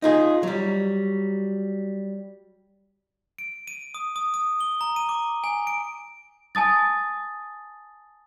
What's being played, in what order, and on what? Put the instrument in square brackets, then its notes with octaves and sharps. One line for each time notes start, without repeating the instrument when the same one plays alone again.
[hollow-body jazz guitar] D#4 F4 G#4
F#3 G3
[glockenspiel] D7
D#7
D#6
D#6
D#6
G7
A#5
D#7
D6
G#5
D7
[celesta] G#5 A5 D#6 A6